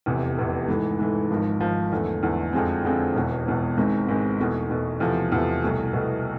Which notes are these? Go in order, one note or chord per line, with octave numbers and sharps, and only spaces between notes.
F1 E2 C3
F1 E2 C3
G#2 E3 A3
G#2 E3 A3
G#1 G#2 F3
G#1 G#2 F3
E2 D3 A3
E2 D3 A3
F2 D3 F3 G#3 C4
F2 D3 F3 G#3 C4
E1 E2 B2
E1 E2 B2
G#1 G#2 G#3 C4
G#1 G#2 G#3 C4
E2 B2 A3
E2 B2 A3
E2 C3 F3 A3
E2 C3 F3 A3
C2 B2 A3
C2 B2 A3